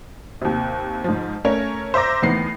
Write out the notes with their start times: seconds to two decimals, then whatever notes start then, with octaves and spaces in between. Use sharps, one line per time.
0.42 D#2 C3
1.04 G#2 F3
1.45 A3 C#4 A#4 C#5
1.94 C5 E5 A#5 D6 A#6
2.22 E2 A2 D#3 B3 C7